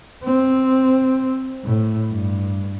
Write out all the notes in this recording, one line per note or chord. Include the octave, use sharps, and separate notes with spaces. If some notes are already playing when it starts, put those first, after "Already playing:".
C4
A2
G2